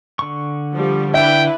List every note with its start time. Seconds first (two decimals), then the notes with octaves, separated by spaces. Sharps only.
0.19 D3 C#6
0.74 F3 G3
1.14 D4 E4 B4 E5 G5